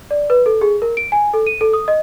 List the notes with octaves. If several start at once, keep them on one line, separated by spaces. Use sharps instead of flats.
D5
B4
A4
G#4
A#4
D7
G#5
A4
D#7
A4
D#6
D#5